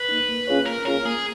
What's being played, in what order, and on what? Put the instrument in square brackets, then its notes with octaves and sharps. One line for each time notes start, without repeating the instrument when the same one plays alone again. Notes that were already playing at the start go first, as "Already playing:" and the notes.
Already playing: [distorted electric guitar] B4
[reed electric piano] A#3 D#4
A#3
C#4 F4 G#4 C#5
[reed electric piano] A#3 [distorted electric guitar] A#4
[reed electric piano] C#4 F4 G#4 C#5 [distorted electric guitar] A#4
[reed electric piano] A#3 [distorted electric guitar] G#4